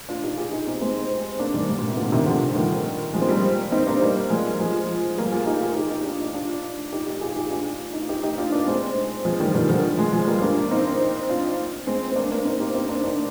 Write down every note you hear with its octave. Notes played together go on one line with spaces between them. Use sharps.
D4 F4
D#4 G4
F4 G#4
D#4 G4
C4 D#4
G#3 C4
A#3 D4
D#3 G3
G#2
A#2
G#2 C3
A#2 D3
C3 D#3
D3 F3
D#3 G3
F3 G#3
C4
G3 A#3
C4 D#4
A#3 D4
G3 A#3
F3 G#3
F3 G#3
G3 A#3
F4 G#4
D#4 G4
F4 G#4
D#4 G4
D#4 G4
D4 F4
D4 F4
D#4 G4
D#4 G4
F4 G#4
D#4 G4
D4 F4
D#4
F4
D#4 G4
D#4 G4
D4 F4
A#3 D4
G#3 C4
F3 G#3
D#3 G3
D#3 G3
D3 F3
F3 G#3
F3 G#3
G3 A#3
A#3 D4
C4 D#4
D4 F4
G#3 C4
C4
A#3 D4
A#3 D4
C4 D#4
D#4 G4
C4 D#4
A#3 D4
A#3 D4